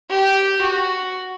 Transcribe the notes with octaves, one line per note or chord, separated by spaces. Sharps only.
G4
F#4